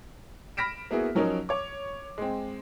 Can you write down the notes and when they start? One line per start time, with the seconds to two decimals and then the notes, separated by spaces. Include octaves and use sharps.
0.57 B5 F6 A#6 B6 D7 E7
0.91 A#3 B3 E4 F#4 G#4
1.15 F3 F#3 C#4 D#4 A#4
1.49 C#5 D6
2.18 G#3 C4